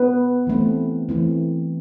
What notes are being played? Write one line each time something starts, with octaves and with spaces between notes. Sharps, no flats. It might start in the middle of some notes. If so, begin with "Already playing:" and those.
Already playing: B3 B4
E3 A3 C4
E3 A3 C4